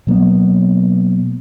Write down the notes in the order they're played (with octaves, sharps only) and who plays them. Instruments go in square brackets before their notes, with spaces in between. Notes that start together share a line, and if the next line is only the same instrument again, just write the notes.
[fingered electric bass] B2 F#3 A#3 B3